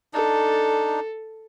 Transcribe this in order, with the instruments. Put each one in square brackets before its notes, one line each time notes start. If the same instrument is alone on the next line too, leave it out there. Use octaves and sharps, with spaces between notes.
[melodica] D4 D#4 [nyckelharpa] A4